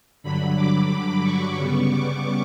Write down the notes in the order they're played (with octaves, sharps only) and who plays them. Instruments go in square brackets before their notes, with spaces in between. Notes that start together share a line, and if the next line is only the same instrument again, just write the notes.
[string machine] G2 D3 F#3 B5
D6
D6
C#6
C#3 G3 B3 C#6
D6